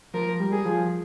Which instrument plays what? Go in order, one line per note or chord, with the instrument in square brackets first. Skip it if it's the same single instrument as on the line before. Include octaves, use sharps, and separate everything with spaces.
[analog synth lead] F3 [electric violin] A#4
[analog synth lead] G3
[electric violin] G#4
[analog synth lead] F3